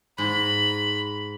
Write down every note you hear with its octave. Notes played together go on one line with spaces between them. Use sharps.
G#2 B5